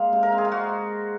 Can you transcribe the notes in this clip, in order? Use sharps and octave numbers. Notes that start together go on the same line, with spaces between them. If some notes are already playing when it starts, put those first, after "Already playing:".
Already playing: G#3 A#3 F5
C3
A#4
C4
G#4
F4
G#3 F#4